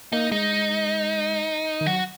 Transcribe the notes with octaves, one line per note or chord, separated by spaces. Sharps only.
A#3 D#4
G#3 D#4
D#3
F#3 F#4